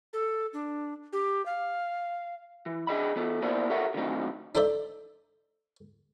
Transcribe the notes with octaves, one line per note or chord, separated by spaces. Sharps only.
A4
D4
G4
F5
E3
D4 G#4 D#5 B5
E3 B3 A4
A#3 B3 E4 A#4 C5 D5
G4 A4 A#4 C#5 E5 F#5
D3 D#3 F#3 A3 C4 D#4
D4 D#4 A4 C5 D5 E5